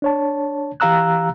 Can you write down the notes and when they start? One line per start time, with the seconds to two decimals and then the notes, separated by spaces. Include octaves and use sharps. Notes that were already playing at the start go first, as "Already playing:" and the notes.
0.02 D4 C#5 A5
0.80 E3 G4 F5 A#5 E6 F#6